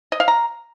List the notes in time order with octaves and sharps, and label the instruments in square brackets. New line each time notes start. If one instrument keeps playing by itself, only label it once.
[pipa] D#5
F5
A#5